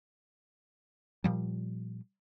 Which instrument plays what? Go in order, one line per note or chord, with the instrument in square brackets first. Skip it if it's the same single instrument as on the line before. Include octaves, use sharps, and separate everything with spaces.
[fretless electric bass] A#2 F3 G3